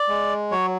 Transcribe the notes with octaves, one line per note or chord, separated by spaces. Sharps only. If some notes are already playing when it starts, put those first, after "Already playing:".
Already playing: D5
G#3
F#3 C#5